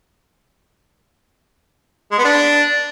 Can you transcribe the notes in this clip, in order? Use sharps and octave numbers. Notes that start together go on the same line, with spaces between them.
G#3
B3
D4